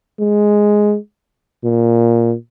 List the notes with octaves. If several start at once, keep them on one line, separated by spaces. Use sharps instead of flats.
G#3
A#2